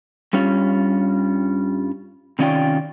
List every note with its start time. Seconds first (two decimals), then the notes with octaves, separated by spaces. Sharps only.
0.33 G2 G3 C#4 F4
2.39 C3 D#3 C#4 F4 D5 G5